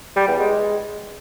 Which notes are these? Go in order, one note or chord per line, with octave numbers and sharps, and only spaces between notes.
G3
E2
G#3